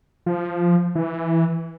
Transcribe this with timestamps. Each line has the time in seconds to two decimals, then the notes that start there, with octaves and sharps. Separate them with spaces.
0.26 F3
0.95 E3